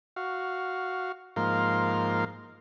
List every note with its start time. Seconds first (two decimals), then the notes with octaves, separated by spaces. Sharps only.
0.16 F#4 F5
1.36 G#2 F3 A#3 A#4 F5 C6